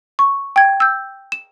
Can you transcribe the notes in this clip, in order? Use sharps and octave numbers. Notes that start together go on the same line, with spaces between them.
C#6
G5 G#6
E6 G6
E7